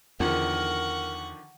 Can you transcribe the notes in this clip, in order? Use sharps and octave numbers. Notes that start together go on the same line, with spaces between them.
E2 D3 D#3 F3 A#4 F#5 C#6